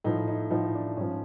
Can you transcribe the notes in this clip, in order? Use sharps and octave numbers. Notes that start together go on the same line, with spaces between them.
A2 F3 D#4
D#4
A2 F3 D#4
D4
G#2 F3 C#4